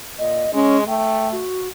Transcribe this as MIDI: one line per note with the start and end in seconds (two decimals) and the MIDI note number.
0.18 0.47 46
0.18 0.53 75
0.53 0.85 56
0.53 0.77 61
0.87 1.42 57
0.87 1.28 79
1.32 1.68 66